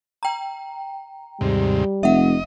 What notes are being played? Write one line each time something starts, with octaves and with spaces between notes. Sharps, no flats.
G5 A#5
D#2 G#2 C3 G3
F1 D#5 E5 F#5